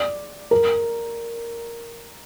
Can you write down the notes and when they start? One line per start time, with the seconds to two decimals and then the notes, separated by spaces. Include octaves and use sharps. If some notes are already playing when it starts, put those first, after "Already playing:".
Already playing: D5
0.51 A#4